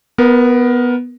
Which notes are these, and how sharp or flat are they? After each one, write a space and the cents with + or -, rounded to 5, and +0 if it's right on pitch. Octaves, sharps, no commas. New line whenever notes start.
B3 +0 A#4 +20